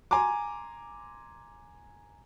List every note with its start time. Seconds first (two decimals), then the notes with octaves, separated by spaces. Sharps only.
0.11 G#5 A#5 C6 D6